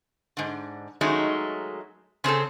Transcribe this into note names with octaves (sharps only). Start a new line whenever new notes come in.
G#2 D3
D#3 F#3 G#3 A3 C#4 D#4
C#3 C4 G#4 A4